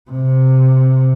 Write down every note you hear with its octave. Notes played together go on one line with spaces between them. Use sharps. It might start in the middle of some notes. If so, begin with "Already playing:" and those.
C3